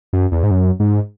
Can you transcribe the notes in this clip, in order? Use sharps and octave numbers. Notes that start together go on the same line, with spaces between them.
F#2
E2
G#2
F#2
G#2